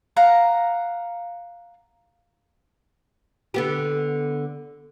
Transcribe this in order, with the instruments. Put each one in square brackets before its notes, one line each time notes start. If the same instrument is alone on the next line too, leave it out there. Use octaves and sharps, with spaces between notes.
[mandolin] F5 F#5 A#5
[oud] D3 B3 G4